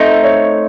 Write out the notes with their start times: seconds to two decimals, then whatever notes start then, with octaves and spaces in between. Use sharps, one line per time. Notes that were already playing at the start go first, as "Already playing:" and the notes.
Already playing: A3 C4 D#4 D#5
0.24 C#5